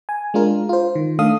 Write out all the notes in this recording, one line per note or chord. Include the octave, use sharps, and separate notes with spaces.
G#5
G#3 D4 F4 A#4
F4 C5
D#3
D#3 A3 D4 A4 F5 D#6